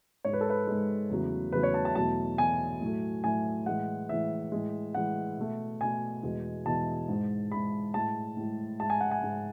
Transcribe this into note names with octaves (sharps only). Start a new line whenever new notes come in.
G#2 G#3 C#5
B4
A4
B4
G#2 G#3
E2 C#3 F#3 A3
E2 C#3 F#3 A3 B4
C#5
A5
A5
E2 B2 F#3 A3 A5
E2 B2 F#3 A3 G#5
A2 F#3 A3
A2 F#3 A3 G#5
A2 E3 G#3 F#5
A2 E3 G#3 E5
A2 E3 G#3
A2 E3 G#3 F#5
B2 A3
B2 A3 G#5
E2 B2 G#3
E2 B2 G#3 A5
G#2 G#3
G#2 G#3 B5
A2 G#3 A5
A2 G#3
G#2 G#3 A5
G#5
F#5
G#5
G#2 G#3